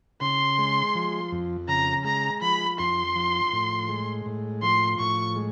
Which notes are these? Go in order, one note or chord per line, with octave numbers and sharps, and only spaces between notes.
C#3 C6
G#3
F3
F2
C#3 A#5
G#3 A#5
F3 B5
F2 C6
F3
A2
G#3
A2
F3 C6
A2 C#6
G#3